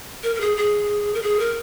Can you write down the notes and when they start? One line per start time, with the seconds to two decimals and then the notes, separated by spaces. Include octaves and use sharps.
0.23 A#4
0.36 A#4
0.40 G#4
0.57 G#4
1.14 A#4
1.23 G#4
1.39 A#4